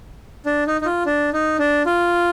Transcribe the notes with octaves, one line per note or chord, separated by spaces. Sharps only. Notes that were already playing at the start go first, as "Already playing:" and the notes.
D4
D#4
D#4
F4
D4
D#4
D4
F4